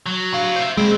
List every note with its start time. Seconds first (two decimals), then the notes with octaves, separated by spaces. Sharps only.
0.06 F#3
0.33 A2 F5
0.56 C5 E5
0.77 A#2 G3 G#3 C4